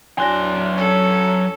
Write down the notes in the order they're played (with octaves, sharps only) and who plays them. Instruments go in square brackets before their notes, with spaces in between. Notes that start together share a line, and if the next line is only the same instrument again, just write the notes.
[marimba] E2 F#4 A#6 [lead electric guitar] F#3 C6 [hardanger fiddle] D4
[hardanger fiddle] C#4 A4